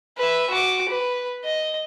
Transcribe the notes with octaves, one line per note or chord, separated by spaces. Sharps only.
B4 E5
F#4 D6
B4
D#5